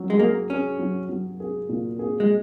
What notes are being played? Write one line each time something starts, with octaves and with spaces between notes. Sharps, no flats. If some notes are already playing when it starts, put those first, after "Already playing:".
Already playing: F#3 C#4
G#3
A#3 G#4
C#4 G#4
F#3
F#3
G#4
A#2
G#4
G#3